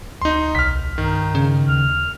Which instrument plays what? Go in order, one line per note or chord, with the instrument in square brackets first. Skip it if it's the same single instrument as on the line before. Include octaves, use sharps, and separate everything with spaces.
[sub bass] D2 [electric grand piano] D#4 C6
[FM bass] B1 [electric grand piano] F6 B6
[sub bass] G2 [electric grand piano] D#3 [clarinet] D#4
[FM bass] C#3
[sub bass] D#2 [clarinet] F6